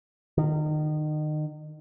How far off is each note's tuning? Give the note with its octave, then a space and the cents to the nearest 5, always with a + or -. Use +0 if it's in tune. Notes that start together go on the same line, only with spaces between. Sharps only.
D#3 -30